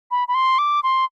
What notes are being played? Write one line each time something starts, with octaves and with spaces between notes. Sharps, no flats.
B5
B5
C6
D6
C6